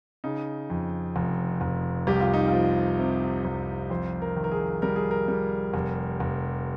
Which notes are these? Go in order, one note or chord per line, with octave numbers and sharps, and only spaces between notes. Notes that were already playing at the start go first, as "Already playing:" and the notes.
C#3 D#4
F2
F1
F1
C2 G4
F4
D#4
F4
F3
C3
C2
F2 C5
A#4
D#3
A#4
G#4
G3 A#4
G#4
A#4
G3
F1
F1